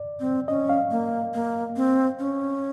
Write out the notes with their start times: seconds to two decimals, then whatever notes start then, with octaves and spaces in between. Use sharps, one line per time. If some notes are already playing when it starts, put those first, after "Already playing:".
Already playing: D5
0.20 C4
0.48 C#4 D#5
0.69 F5
0.91 A#3
1.34 A#3
1.76 C4
2.19 C#4